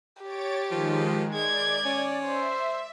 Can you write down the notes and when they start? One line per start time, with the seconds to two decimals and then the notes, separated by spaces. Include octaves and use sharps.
0.22 G4 C#5 A6 D7
0.71 D#3 F3 G#3
1.34 G#3 D5 G#6
1.85 C#4
2.26 C5 E5